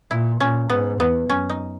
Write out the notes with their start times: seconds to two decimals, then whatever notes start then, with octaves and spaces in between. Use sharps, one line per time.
0.11 A#2 E4
0.40 A#2 C#4
0.70 G#2 B3
0.99 E2 B3
1.29 F#2 C#4
1.49 D#4